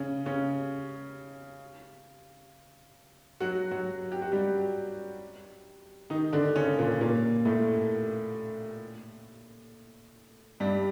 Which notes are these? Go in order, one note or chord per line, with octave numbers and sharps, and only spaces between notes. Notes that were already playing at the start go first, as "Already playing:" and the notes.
Already playing: C#3 C#4
C#3 C#4
F#3 F#4
F#3 F#4
G4
F#4
G3 G4
D#3 D#4
D3 D4
C#3 C#4
A#2 A#3
A#2 A#3
A2 A3
G2 G3